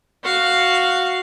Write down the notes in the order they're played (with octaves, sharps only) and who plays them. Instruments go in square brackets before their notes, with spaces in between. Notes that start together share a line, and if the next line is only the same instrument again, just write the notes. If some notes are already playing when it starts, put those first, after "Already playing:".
[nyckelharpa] F#4 F5